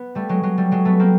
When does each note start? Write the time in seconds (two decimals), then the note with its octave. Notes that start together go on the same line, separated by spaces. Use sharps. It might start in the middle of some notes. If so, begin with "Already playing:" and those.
Already playing: B3
0.15 G3 A3
0.29 F#3 G#3
0.43 F#3 G#3
0.58 G3 A3
0.71 F#3 G#3
0.85 A3 B3
1.00 A#3 C4